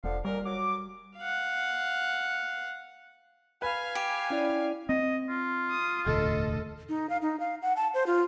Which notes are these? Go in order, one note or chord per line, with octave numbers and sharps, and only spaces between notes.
E1 D3 F3 F5
F2 A#2 G3 A#4
F#3 D6
F5 F#5
B4 F5 G#5
G4
C#4 E4 D5
C4 D#5
F4
D#6
E1 D2 A2 A4 D#5
D#4
F5
D#4
F5
F#5
A5
C5
F4